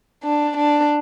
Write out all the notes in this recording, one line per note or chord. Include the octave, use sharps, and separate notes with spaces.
D4
D4